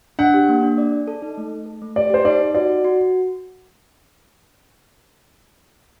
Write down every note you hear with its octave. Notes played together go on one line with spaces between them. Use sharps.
D4 F#5
G4
A#3
D4
D5
D5
A4
D#4
A3
A3
A4
A3
G4 D5
G4 C5
D#4 D5
D#4
F#4 D5
F#4
F#4